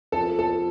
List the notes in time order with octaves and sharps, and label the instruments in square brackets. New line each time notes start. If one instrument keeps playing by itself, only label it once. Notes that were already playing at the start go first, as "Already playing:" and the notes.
[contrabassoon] F2 [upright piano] A4
[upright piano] A4